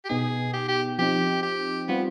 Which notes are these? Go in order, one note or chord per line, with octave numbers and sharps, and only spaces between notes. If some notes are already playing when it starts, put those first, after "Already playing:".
G4
B2 B3 D#4 G#4
G4
G4
F3 C4 D#4 G4
G4
G3 B3 C4 F4